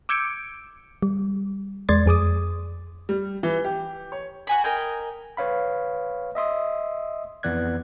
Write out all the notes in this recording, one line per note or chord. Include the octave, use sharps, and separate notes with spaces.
D6 E6 G6 G#6 C#7 D7
G3
E2 G#3 D5 C6 G#6 A6
F2 G#4 D6 D#6
G3
E3
G4
C#5
F#4 G#5 B5
A#4 D#5 G5 G#5
B4 C#5 F5 B5
D#5 E5 C6 D#6
F2 E3 B3 D5 F#6 G#6